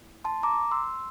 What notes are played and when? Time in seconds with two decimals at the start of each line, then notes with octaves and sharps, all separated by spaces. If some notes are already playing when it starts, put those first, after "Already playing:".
Already playing: A#3 E4
0.24 A5 C6
0.43 A#5 D6
0.71 C6 E6